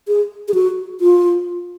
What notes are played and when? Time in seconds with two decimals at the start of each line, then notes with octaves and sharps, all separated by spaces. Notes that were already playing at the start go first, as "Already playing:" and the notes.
0.08 G#4
0.48 G#4
0.54 F#4
1.01 F4